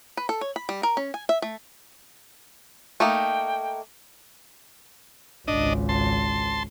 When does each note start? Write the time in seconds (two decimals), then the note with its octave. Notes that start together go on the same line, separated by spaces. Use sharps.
0.17 B4
0.29 A4
0.41 C#5
0.56 B5
0.69 G3
0.83 A#4
0.97 C#4
1.14 G#5
1.29 E5
1.42 A3
3.00 A3 A#3 D#4 G5
5.48 G#1 C#2 D4 D#5
5.89 A5 C6